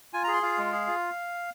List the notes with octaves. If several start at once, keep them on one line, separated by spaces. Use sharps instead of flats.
F4 G#5
A#5
G#4
C6
F4 F5
G#3
G#4
F4